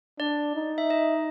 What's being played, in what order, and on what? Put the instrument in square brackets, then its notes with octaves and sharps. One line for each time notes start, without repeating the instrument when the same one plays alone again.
[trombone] D4 [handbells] D5
[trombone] D#4
[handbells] E5
D#5